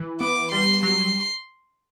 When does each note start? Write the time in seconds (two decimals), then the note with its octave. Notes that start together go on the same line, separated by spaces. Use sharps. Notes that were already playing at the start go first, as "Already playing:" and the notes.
Already playing: E3
0.21 B3 D6
0.52 G3 C6
0.83 F#3 C6